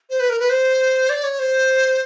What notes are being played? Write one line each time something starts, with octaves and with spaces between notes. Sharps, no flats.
C5
B4
A#4
B4
C5
D5
C#5
C5